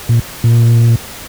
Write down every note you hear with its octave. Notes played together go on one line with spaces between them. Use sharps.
A#2
A#2